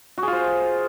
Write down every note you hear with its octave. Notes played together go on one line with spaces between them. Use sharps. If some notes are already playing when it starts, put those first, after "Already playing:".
F#4
G#4
F4
C5